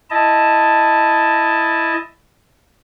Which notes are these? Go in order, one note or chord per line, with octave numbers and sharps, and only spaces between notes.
E4 D#5 A5